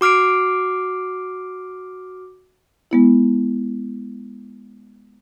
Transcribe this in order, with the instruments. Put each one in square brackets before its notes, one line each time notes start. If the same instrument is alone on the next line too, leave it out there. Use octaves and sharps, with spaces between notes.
[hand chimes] F#4 D6 F6 C7 D7
[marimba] G#3 B3 E4